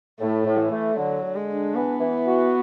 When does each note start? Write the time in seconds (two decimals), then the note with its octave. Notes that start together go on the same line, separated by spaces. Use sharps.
0.20 A2 A3
0.46 A2
0.59 E3
0.71 A3
0.97 D3 F#3
1.23 D3
1.35 G#3
1.49 D4
1.74 E3 B3
2.00 E3
2.26 F#4